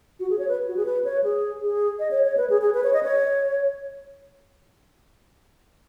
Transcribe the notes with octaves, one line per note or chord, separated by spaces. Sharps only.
F#4
G#4
C#5
B4
F#4
G#4
B4
C#5
G#4
G#4
D#5
C#5
C#5
B4
G#4
G#4
B4
C#5
D#5
C#5